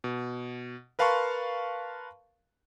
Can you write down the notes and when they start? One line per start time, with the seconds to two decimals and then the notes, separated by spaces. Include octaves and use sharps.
0.04 B2
0.99 A#4 B4 F5 A5 C6 C#6